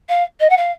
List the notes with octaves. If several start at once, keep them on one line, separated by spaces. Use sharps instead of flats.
F5
D#5
F#5
F5